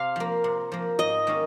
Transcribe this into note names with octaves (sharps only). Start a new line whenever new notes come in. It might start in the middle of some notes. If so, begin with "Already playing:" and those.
Already playing: C3 F5
F3 A#3
C3
F3 A#3
G#2 D#5
D#3 A#3 C#4